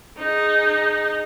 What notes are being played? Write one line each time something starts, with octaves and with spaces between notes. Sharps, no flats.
D#4 G#4